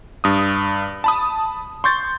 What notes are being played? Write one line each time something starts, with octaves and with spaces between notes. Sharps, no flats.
G2 D#6
A5 B5 D#6
C6 C#6 G6 A6